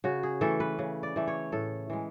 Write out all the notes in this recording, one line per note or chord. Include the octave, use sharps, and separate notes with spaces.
C#3 F#4
G#4
E3 A3 A4
B4
C#3
D5
E3 A3
C#5
A2 A4
E3 G#3